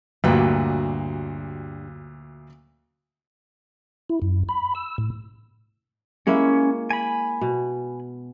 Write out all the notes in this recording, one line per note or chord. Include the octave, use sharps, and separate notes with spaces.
D2 G2 A#2 F#3 G4 B4
E4
F#2
B5
E6
A2
G#3 A#3 C#4 E4
G#5 B5
B2